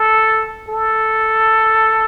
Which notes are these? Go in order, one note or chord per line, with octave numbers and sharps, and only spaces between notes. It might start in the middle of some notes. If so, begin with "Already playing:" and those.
Already playing: A4
A4